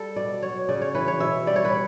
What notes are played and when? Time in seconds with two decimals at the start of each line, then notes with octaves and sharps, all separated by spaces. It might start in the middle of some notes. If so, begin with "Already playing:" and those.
Already playing: G3 A4
0.16 B2 D5
0.43 F#3 C#5
0.69 C#3 D5
0.82 C#5
0.95 E3 B4
1.08 C#5
1.20 B2 E5
1.47 G3 D5
1.56 C#5
1.65 B4